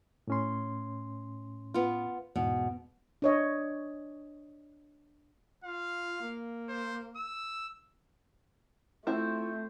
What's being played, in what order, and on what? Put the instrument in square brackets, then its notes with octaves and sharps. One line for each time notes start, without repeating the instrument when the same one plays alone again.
[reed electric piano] A2 C#4 C6
[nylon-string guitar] B3 F4
[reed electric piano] E2 G#2 [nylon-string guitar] B2
[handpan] D4 C#5 D#5
[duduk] F4 [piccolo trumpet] F5
[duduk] A#3
[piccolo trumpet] C5
E6
[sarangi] A3 [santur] C4 C5 [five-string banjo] E4 [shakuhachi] F4